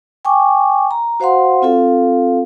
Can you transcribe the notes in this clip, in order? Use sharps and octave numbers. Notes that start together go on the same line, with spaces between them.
G5 G#5 C#6 D6
A#5
F#4 C5 F5 F#5 C6
C4 F4 A4 F5